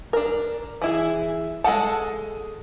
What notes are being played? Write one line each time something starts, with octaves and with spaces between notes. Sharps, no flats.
D4 A#4
E3 E4 G#4
G#3 F#4 A4 F#5 A5